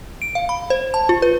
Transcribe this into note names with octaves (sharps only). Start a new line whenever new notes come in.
D7
F5
B5
C5
A5
F4
B4